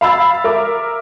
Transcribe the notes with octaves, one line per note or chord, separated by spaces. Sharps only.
F5 B5 E6 A6
A#4 E5 D6